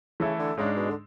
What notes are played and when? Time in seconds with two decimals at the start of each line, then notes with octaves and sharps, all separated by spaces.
0.20 C#3 E3 A3 E4 A4
0.39 D3
0.57 G#2 C#3 G#3 D4
0.76 B2
0.90 D3